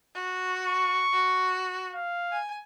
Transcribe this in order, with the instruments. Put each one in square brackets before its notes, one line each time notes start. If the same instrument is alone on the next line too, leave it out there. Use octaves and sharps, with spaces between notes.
[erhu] F#4
[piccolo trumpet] C#6
[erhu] F#4
[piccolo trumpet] F5
[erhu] G#5